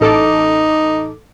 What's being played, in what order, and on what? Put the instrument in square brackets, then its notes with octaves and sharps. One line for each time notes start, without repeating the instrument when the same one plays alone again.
[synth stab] A1 A4 D6 [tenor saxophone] D#4